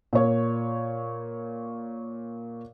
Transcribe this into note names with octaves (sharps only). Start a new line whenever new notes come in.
A#2 C#5